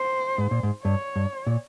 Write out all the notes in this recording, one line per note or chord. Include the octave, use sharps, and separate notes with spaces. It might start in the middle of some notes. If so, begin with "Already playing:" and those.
Already playing: C5
G#2
A#2
G#2
G2 C#5
G2
A#2